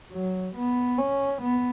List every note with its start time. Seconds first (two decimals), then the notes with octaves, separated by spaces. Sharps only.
0.13 F#3
0.56 B3
0.98 C#4
1.41 B3